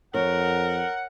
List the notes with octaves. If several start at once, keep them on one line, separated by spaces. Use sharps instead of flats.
F2 A#4 C#5 F#5